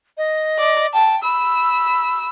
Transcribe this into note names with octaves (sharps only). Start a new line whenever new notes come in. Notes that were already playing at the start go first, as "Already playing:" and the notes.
D#5
D5
G5 A5
B5 E6